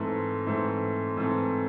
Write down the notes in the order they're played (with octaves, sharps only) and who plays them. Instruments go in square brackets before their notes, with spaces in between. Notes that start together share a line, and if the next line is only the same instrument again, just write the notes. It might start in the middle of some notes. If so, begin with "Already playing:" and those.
Already playing: [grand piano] G#2 E3 A3 C4
G#2 E3 A3 C4
G#2 E3 A3 C4